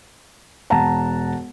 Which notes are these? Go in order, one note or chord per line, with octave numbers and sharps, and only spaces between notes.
E1 F#5 A5 A#5